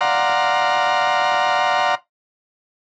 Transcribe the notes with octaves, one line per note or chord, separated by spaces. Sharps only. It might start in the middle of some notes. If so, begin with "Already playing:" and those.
D5 F5 F#5 A#5 C6